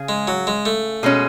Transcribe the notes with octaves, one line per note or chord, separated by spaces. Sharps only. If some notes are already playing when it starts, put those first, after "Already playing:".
Already playing: C#3 G#4
G#3
F#3
G#3
A3
B2 G#3 C#4